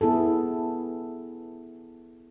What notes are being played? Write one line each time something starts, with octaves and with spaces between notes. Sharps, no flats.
B3 E4 G#4 A4